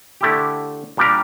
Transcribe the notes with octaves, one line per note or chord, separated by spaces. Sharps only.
D3 A3 E4 G4
A#2 G3 D4 G4 A#4